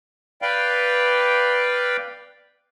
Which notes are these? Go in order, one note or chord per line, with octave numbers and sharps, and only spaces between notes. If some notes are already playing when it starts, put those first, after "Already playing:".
B4 D5 F5 G5